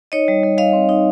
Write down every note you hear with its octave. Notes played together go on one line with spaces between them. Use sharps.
D#4 C#5 D#5
G3
G3
G3 D#5 F5
C4
D#4